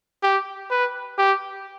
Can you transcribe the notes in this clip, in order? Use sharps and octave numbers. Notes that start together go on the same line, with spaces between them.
G4
B4
G4